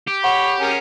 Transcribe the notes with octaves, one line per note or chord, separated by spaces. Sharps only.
G4
C#5 F#5 B5
C#4 G#4 A#4